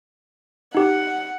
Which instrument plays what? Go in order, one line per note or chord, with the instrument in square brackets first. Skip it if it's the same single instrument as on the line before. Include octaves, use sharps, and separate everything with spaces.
[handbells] D#4 G4 [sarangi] F#5